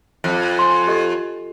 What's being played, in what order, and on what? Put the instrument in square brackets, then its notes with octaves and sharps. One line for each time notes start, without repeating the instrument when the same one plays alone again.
[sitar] F2
[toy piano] G#5 C6
G4 A4 D#5